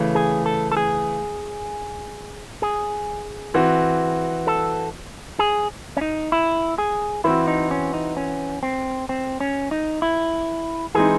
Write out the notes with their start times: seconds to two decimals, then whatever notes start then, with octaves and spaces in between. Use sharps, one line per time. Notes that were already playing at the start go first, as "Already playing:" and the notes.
Already playing: C#3 E3 A3
0.15 G#4
0.46 A4
0.72 A4
0.77 G#4
2.62 G#4
3.54 E3 C4 F#4
4.47 A4
5.39 G#4
5.97 C#4
6.01 D#4
6.32 E4
6.78 G#4
7.24 E3 C4 E4 F#4
7.47 D#4
7.71 C#4
7.94 D#4
8.17 C#4
8.63 C4
9.09 C4
9.40 C#4
9.71 D#4
10.02 E4
10.95 E3 G#3 C4 D#4 G#4